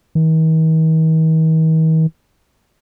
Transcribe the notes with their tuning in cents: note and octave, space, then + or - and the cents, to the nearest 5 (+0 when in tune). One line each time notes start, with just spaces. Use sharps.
D#3 +45